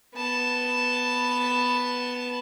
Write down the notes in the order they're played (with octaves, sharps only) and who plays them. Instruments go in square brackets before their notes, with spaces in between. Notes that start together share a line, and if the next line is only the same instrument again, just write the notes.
[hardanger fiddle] B3 A5